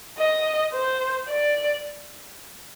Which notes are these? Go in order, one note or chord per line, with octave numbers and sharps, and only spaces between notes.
D#5
C5
D5